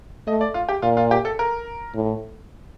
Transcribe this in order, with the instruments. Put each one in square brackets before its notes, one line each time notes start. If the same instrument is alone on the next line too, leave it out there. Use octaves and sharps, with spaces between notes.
[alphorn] A3 [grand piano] D#5
[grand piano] D5
F4
G4
[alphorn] A#2 [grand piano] F4
[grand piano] F4
G4
A4
A#4
[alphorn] A2